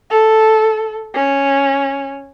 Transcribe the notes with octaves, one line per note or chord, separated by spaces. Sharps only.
A4
C#4